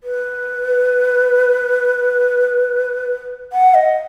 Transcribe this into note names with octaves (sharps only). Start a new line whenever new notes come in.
B4
F#5
D#5